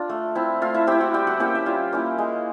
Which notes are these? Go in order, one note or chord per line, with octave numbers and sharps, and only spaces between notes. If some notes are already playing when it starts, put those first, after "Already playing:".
Already playing: D4 F4
A3
C4 E4
A3 F4 F5
E4 E5
C4 E4 G4 G5
F#4 F#5
G3 G4 G5
F#4 F#5
A#3 C#4 E4 G4 G5
E5
G3 F4 F5
A#3 C#4 E4
G#3